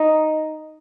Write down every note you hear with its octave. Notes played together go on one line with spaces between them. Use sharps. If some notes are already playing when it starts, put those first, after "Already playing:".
Already playing: D#4